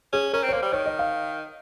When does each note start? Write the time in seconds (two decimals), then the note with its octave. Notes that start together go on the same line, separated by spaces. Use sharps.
0.13 C#4 G#4
0.33 C#4 A#4
0.43 C4
0.49 C#5
0.53 A#3 C5
0.62 G3
0.73 D#3 C#5
0.86 D#5
0.99 F5